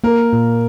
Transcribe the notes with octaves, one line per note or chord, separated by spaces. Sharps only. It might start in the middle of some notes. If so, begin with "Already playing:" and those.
A#3 A#4
A#2